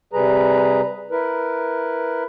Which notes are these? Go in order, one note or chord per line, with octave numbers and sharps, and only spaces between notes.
C3 G3 G#4 B4 A#5
E4 A#4 B4